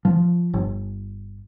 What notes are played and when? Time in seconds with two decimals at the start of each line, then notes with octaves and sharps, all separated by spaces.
0.05 F3
0.54 G1